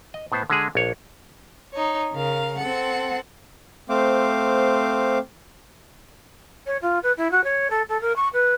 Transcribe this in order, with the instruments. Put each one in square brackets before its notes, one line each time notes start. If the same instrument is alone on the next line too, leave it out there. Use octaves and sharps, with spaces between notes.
[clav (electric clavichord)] D#5
A2 B3 C5
D3 G#3 G#4
A#1 C#5
[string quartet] D#4 C#5
C#3 A#4 F5
C4 A4 F#5
[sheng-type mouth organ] A3 C4 C5 F5 D6
[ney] C#5
F4
B4
E4
F#4
C#5
A4
A4
A#4
C#6
B4